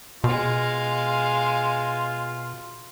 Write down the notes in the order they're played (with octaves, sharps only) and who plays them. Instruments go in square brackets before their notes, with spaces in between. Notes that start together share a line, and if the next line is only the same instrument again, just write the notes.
[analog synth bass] B2 [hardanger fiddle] G#3 F5 [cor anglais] F4